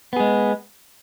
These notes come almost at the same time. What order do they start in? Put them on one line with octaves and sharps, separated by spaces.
B3 G#4 G#3